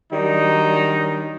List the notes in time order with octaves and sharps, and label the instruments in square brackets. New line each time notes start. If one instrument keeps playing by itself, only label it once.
[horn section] D#3 F#3 G3 D4 D#4